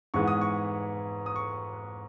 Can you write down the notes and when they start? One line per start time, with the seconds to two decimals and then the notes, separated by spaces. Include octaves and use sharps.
0.14 G#2 E3 G#3 B3 C#6
0.28 D#6
0.41 C#6
1.26 D#6
1.36 C#6